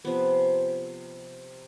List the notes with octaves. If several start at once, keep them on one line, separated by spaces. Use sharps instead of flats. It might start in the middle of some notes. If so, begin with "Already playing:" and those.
C3 F3 B3